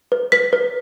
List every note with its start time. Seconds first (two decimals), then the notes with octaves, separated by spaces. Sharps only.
0.12 B4
0.32 B4 B6
0.53 B4